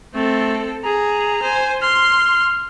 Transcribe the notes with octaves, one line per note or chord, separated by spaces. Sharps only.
A3 C4 A4
G#4 A#5
C5 G#5
C6 F6